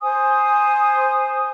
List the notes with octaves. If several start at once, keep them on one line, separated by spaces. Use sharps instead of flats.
C5 G#5 D#6